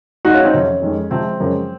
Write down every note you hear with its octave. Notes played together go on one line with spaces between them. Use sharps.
G#2 D#3 G#3 D#4 F#4
C#4 F4
C4 D#4
F2 C3 F#3 C#4
F2 D#3 G#3
C3 F3 G#3 C4
F#2 C#3 F3 G#3